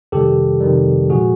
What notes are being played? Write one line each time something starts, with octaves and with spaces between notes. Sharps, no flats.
F2 C3 D#3 G3 G4 A4
F2 C3 D#3 G3
A#2 F3 G#3 F#4 G#4